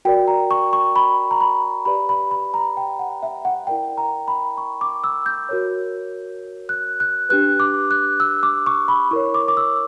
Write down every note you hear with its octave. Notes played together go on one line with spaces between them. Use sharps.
F#4 A#4 D5 G5
A#5
C#6
C#6
B5
A#5
B5
G4 B4 D5 B5
B5
B5
A#5
G5
F#5
E5
F#5
E4 A#4 D5 G5
A#5
B5
C#6
D6
E6
G6
F#4 A#4 C#5
F#6
F#6
D4 G4 B4 F#6
D6
F#6
E6
D6
C#6
B5
E4 A#4 C#5 C#6
D6
D6
E6